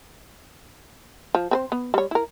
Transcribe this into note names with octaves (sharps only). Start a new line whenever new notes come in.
F3
C4 B4 C5
B3
G3 C#5
E4 A#4